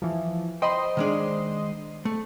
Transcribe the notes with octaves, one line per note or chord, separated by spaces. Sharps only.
E3 F3
C5 D#5 G5 B5 C6
D#3 G#3 D4
A3